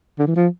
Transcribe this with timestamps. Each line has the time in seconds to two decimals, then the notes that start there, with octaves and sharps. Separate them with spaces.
0.19 D3
0.27 E3
0.36 F3